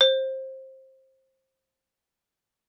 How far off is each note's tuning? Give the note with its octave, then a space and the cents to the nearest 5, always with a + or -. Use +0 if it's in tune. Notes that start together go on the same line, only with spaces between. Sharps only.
C5 +20